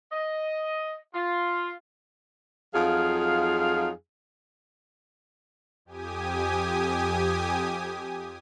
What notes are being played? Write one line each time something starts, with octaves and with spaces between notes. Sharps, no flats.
D#5
F4
F2 F#3 D#4 F4 G#4 F5
F2 G4 G#5 D#6